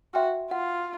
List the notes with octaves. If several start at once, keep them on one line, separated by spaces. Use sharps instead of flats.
F#4 E5 G5 C6 F6
F4 F#5